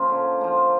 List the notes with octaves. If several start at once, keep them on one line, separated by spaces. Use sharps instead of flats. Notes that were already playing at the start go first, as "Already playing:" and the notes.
Already playing: F3 A#3 C#4
D3
F3 A#3